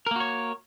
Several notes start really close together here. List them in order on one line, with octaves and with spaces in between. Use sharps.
A#4 A#3 F#4 C#5